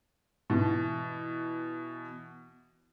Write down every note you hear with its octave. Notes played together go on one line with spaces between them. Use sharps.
B2 E3